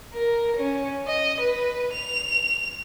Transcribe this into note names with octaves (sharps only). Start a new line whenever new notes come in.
A#4
C#4
D#5
B4
F7